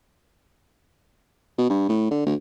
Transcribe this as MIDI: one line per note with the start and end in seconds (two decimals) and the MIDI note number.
1.58 1.68 47
1.70 1.85 43
1.89 2.07 45
2.11 2.26 50
2.26 2.34 38